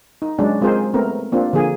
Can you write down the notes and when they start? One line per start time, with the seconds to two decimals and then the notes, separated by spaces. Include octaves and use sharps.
0.22 D#4
0.39 F#3 G#3 C#4 D4
0.61 G#3 C4 F4 G#4 A#4 C5
0.94 A3 B3 C4 A#4
1.32 A#3 C4 D4 F4
1.53 D3 F3 A#3 G#4